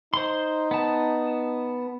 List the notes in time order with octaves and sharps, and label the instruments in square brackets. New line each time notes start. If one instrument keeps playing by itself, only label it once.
[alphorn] D#4 [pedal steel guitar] C5 C6
[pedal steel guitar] B3 A5